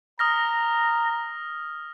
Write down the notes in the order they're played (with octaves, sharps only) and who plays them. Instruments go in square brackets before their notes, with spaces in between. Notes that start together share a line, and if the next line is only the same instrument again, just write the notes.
[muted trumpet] A#5 [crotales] D#6 F6 A#6